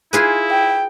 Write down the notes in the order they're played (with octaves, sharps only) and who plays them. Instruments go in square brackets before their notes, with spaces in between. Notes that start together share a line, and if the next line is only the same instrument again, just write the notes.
[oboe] E4 [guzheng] F4 G#4 B4
[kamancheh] G5